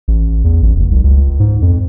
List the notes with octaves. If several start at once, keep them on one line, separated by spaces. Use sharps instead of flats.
A1
E2
A1
F1
C2
C#2
G#2
F2